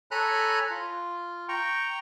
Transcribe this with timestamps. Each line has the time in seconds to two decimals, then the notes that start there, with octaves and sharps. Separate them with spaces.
0.11 A4 C#5 G#5 A#5 B5 F#6
0.70 F4
1.49 G5 A#5 C#6